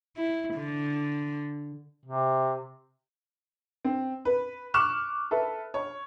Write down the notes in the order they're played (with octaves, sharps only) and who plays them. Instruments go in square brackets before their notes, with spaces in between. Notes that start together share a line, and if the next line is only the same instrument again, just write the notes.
[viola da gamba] E4
D3
[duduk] C3
[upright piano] C4
B4
C#6 D6 F6 F#6 E7
A4 B4 E5
C#5